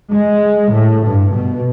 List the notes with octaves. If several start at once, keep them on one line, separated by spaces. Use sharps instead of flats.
G#3
A2
G2
B2